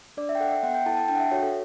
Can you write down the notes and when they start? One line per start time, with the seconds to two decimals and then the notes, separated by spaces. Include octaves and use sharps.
0.17 D4 D5
0.29 E5
0.35 G5
0.40 A4 F#5
0.51 E5
0.63 B3 F#5
0.75 G5
0.86 E4 A4 A5
0.97 A5
1.08 D4 G5
1.15 F#5
1.20 E5
1.31 F#4 A4 C#5
1.43 A4